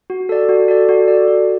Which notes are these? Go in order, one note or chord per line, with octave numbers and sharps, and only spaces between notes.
F#4
A4 D5
F#4
A4 D5
F#4
A4 D5
F#4